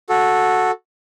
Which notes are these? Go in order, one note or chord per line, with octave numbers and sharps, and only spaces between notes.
F#4 A4